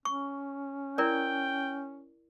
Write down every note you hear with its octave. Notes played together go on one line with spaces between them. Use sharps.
C#4 C#6
E4 A#4 D5 G5